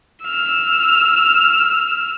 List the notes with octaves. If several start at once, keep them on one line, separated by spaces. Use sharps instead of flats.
E6 F6